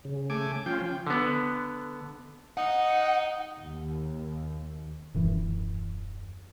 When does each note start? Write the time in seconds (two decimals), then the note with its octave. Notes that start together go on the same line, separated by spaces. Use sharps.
0.05 C#3
0.30 A3 G#5 D6
0.66 F3 C#4 F4 G5
1.07 D3 B3
2.57 D#4 F#5
3.59 D#2
5.14 D#1 F#2 E3